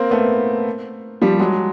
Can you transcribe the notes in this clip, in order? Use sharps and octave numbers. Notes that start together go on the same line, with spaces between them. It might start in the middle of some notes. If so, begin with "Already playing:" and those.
Already playing: A#3 C4
A3 B3
F3 G3
F#3 G#3